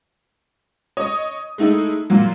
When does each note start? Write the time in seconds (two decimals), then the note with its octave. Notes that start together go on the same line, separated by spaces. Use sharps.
0.97 C#5 D#5 D#6
1.58 G#3 A3 D#4 E4
2.10 A#2 E3 F#3 A#3